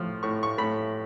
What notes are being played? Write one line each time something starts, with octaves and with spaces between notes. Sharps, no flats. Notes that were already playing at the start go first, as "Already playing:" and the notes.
Already playing: A2 F3
A2 C#6
C#6
A2 B5